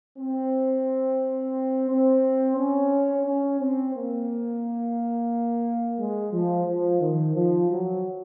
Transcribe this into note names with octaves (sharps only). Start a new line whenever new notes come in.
C4
C4
C#4
C#4
C4
A#3
G#3
F3
F3
D#3
F3
F#3